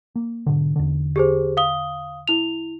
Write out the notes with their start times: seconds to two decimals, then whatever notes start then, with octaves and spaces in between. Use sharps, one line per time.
0.16 A#3
0.47 G#2 B2 D3
0.76 E2 D3
1.16 G4 G#4 C5
1.57 F5 D#6 G7
2.28 E4 F7